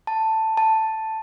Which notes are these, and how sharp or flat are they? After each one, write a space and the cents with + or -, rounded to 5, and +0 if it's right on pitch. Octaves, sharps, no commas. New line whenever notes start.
A5 +10
A5 +5